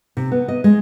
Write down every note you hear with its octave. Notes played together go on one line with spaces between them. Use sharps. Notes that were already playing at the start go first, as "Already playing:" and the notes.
C3
B3
D#5
G#3